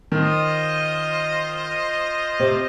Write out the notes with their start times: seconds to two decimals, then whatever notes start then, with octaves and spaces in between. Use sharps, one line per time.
0.12 D#3 F4 C5 D#5
2.39 C3 C4